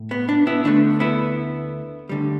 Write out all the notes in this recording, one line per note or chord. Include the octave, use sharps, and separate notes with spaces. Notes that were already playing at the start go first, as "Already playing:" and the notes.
Already playing: A2
B3
D4
B3 E4
D2 D3 A3 D4
B3 E4
D2 D3 G3